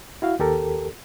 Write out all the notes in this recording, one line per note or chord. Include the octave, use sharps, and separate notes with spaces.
E4 F#4 F5
D#2 G4 A4 A#4